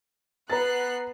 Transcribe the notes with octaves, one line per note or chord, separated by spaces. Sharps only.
B3 B4 A#5 F#6 A6 C7